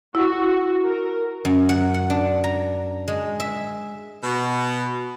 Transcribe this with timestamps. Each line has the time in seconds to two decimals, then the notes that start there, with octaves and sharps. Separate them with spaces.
0.15 E4 F#4
0.85 A#4
1.45 F#2
1.69 F#5
1.94 F#5
2.10 D4
2.44 A#5
3.08 G#3
3.40 E5
4.23 B2